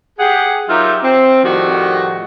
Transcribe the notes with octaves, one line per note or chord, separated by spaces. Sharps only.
G4 G#4 F#5
F#3 D#4 F4 G4 A#4 E5
C4
A2 D#3 F3 G3 F#4